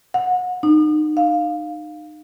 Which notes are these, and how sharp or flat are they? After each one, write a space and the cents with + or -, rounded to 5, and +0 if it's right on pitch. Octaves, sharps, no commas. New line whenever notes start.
F#5 -25
D#4 -30
F5 +10